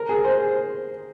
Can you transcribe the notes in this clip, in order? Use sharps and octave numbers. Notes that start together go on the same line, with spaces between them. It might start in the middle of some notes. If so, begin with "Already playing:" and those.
Already playing: A#4
G#4
C5